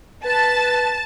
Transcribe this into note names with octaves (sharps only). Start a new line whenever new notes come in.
B4 A5